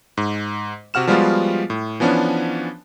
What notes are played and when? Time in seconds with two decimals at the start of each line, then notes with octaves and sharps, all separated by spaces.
0.17 G#2
0.94 C3 F#4 F#5 F6 E7
1.07 F3 G3 G#3 B3 F4 F#4
1.70 A2
2.00 E3 F3 B3 C#4 D4